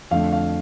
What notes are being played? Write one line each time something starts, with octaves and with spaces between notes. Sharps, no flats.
F2 D3 A3 F5
F5